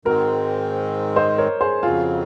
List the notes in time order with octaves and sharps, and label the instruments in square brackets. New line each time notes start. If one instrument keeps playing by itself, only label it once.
[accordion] G#2 D#3 G#3 C4 [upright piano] F#4 A#4
[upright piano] C5 D#5
A#4 C#5
G#4 C5
[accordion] F2 C#3 F#3 C4 [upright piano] F4 G#4